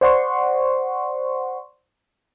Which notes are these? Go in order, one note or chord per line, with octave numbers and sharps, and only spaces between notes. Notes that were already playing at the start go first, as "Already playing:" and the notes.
C5 D5 F#5 C6 C#6